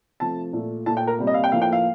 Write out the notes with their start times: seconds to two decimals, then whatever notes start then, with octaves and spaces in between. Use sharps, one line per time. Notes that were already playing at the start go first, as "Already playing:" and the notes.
0.20 C3 F3 A3 A5
0.53 A#2 A3
0.86 A#2 A3 A5
0.97 G5
1.07 A#4
1.18 C3 G3 A#3
1.27 D#5
1.34 F5
1.44 G5
1.52 A2 F3 A#3 F5
1.62 G5
1.73 F5